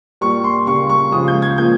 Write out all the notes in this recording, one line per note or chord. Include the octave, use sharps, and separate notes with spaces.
A#2 G3 A#3 C#6
C6
C#3 G3 A#3 C#6
C#6
C#3 F3 G#3 D#6
G6
G#6
A#2 F3 A#3 G6